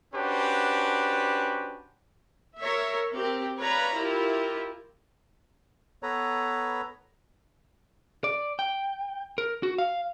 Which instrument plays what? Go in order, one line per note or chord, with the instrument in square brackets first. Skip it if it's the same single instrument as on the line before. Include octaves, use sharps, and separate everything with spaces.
[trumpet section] C#4 D4 F#4 G4 B4 C5
[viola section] A#4 C#5 E5
C4 G4 A#4
B4 C#5 D5 F5 A#5 B5
E4 F4 G4 A#4
[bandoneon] B3 A4 B4 C#5 A#5
[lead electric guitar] D5
G5
A#4
F#4
F5